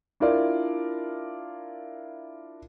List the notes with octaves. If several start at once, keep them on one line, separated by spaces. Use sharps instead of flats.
D4 E4 F4 A#4 D5